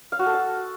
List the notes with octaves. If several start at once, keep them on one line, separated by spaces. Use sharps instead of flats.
F5
F#4
A4
A5